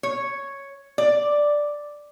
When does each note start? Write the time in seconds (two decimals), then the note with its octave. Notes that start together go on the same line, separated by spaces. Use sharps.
0.03 C#5
0.98 D5